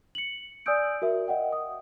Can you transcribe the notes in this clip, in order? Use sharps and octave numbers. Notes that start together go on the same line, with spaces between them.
C#7 F#7
D5 G#5 D#6 E6 G6 D7
F#4 A#4 E5
D#5 F#5 G5
D#6